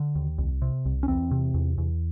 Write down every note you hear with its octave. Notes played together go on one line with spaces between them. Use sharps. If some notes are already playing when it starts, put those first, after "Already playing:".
Already playing: D3
D#2
C2
C3
C2
C#4
E2 C4
C3
E2
E2